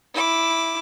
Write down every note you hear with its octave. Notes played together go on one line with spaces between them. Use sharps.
E4 D6